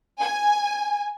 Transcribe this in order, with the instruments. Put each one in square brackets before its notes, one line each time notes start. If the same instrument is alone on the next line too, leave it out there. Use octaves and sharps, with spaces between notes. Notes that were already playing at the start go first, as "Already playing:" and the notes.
[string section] G#5